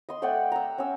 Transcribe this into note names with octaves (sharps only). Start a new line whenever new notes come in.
D#5 C6
A3 D5 F#5 G5
A#5 E6
C#4 E6